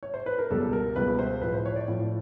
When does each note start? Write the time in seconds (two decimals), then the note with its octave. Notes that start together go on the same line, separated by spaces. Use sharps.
0.03 C#5
0.14 C5
0.26 B4
0.38 A#4
0.50 C#2 B2 G3 A4
0.73 A#4
0.96 C#2 B2 G3 B4
1.19 C5
1.41 A2 F3 B4
1.54 C5
1.65 C#5
1.76 D5
1.88 A2 F3